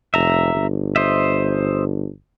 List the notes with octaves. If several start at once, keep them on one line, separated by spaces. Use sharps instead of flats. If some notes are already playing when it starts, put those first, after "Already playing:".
F1 E5 A#5
G1
C5 D#5 E5